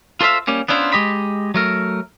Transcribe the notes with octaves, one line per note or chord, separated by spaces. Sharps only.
F4 A4 C5 E5 F5
G3 A#3 C#4 G4
B3 C#4 D4 E4 F4 C5
G#3 G4 D#5 B5
F#3 A3 A#4